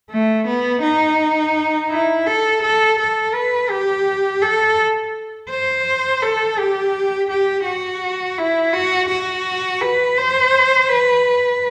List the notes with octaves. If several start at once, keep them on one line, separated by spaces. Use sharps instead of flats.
A3
B3
D#4
E4
A4
A4
A4
B4
G4
A4
C5
A4
G4
G4
F#4
E4
F#4
F#4
B4
C5
B4